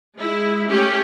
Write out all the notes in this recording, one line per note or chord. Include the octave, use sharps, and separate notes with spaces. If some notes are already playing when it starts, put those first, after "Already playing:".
G#3 E4
A3 C#4 G4